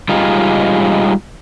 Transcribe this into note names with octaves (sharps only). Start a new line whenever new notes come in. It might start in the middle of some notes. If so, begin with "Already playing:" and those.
G3 G#3 D#4 F4